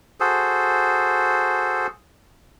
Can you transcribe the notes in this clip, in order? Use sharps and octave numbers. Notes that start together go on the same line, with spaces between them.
F#4 G#4 A4 C5